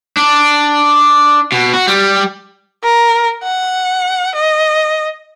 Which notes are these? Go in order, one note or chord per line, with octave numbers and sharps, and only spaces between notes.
D4
B2
F#4
G3
A#4
F#5
D#5